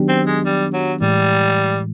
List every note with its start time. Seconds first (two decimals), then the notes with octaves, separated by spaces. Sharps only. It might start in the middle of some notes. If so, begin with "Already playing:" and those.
Already playing: D#3 F#3 B3 D4 G4
0.09 C4
0.27 G#3
0.46 G3
0.74 F#3
1.01 A2 E3 G3 G#3